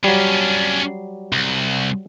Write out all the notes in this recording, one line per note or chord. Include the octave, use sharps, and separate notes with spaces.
F#3 G3 C#4 D4
C2